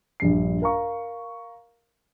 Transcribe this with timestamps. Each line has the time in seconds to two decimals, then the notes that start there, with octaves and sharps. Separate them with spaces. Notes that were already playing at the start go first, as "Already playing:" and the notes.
0.20 A#1 G2 C7
0.62 A#4 F5 A#5 C#6